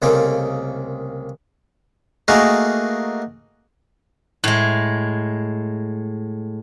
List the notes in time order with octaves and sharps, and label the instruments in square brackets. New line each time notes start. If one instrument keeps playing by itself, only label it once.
[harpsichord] C2 C#3 A3 A#3 C4 D#4
A3 A#3 D#4 F#4 G#4 A#4
[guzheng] A2 G#3